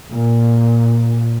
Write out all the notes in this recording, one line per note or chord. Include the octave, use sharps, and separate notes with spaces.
A#2